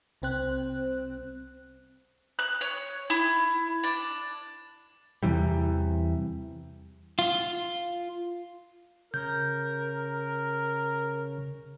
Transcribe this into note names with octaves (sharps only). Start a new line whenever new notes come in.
C2 C3 C4 C5 F#6
F#6
C#5
E4
D4
E2 C3 E3 G3
F4
C#3 A#4 G6